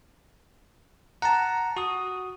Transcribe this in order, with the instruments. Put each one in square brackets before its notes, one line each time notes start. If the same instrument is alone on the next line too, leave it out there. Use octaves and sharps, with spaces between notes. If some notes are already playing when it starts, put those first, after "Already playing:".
[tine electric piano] F#5 A5 [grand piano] A#5
[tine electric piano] F#4 D#6